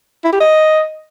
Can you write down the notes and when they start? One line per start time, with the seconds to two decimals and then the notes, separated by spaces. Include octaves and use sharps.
0.25 E4
0.33 G4
0.40 D#5